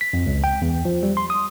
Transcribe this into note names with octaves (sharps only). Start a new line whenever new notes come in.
B6
F2
C#2
G5
E2
F3
G3
C6
D#6